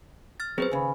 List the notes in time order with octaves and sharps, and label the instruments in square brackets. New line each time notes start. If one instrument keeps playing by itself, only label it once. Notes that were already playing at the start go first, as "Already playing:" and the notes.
[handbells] F6 A6
[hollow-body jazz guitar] F#3 B3 C4 [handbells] G#4 B4 C5
[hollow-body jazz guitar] D#2 C#3 [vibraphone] G#5 B5